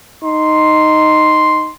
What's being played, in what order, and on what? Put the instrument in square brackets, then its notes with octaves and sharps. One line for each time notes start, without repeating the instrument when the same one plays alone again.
[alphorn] D#4 [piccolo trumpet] C6